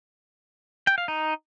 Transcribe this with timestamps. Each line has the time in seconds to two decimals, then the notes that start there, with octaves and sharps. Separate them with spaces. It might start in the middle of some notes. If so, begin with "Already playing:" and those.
0.87 G5
0.98 F5
1.08 D#4